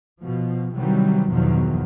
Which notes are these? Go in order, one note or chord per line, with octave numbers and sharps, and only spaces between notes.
B2 F3
C3 D#3 E3 F#3 G3
G1 E2 B2 D#3 F3 F#3